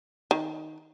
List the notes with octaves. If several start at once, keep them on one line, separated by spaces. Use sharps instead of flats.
D#3